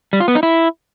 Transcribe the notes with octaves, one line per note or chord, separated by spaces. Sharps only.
G3
F4
B3
D#4
E4